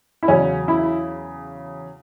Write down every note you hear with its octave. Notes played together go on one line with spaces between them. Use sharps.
E4
E2 C#3 F#3 C#4
E4